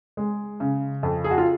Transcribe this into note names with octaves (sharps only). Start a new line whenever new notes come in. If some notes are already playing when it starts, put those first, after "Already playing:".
G#3
C#3
F2
G#4
F#4
F4